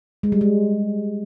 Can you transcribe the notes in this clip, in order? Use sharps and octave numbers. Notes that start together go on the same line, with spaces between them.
G#3
G3
G#3